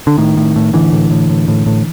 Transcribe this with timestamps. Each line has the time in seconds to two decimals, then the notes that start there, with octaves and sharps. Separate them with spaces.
0.07 D3
0.18 A2 D#3
0.37 A2
0.56 A2
0.73 A2 D3 E3
0.93 A2
1.11 A2
1.30 A2
1.48 A2
1.66 A2